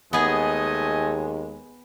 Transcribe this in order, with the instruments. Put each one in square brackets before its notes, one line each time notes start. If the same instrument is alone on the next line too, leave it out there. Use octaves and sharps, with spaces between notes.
[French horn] D#2 [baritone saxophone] G#3 [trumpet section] A3 D#5 G#5 [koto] B3 G#4